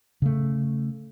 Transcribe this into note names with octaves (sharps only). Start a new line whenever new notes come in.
C#3 A3